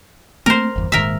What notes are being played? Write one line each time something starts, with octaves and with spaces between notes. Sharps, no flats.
A3 A#3 C4 A#4 C5
G1 E2
D#1 D#2 G#2 A#4 E5